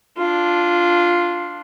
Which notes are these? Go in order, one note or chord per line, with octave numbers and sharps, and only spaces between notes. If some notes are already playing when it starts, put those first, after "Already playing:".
D4 F4